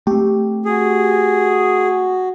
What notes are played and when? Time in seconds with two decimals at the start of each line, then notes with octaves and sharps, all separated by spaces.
0.07 A3 C4 G4
0.65 F#4 G#4